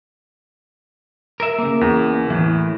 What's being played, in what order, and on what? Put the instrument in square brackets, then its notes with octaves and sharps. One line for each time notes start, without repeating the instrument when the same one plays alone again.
[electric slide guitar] A#4 E5
C#3 A#3
[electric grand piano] E2
[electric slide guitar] A2 E3